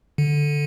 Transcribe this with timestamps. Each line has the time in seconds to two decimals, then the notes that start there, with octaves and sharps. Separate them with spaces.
0.18 D3